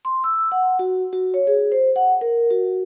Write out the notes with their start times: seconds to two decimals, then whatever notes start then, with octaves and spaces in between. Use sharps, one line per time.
0.05 C6
0.24 E6
0.52 F#5
0.79 F#4
1.13 F#4
1.34 C#5
1.47 G#4
1.72 C5
1.96 F#5
2.21 A#4
2.50 F#4